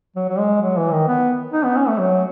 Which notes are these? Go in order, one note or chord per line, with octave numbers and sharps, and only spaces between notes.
F#3
F#3
G#3
F#3
E3
D#3
B3
D#4
B3
C#4
A3
F#3